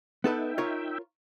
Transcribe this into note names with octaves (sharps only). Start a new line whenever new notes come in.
B3 D#4 A4 B4 E5 G5
F4 A#4 C#5